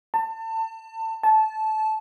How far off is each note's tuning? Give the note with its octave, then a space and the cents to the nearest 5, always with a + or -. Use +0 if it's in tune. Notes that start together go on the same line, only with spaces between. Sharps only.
A5 +30
A5 -20